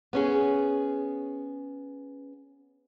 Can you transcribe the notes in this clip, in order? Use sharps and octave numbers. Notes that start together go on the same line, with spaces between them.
B3 C#4 G#4